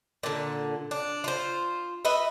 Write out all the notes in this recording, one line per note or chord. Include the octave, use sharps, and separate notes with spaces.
A#2 D3
D4
F4 C5
B4 D#5 E5